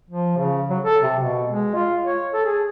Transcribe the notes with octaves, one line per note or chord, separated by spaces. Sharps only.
F3
C#3
F#3
A4
C3
B2
G#3
F4
C#5
A4
G#4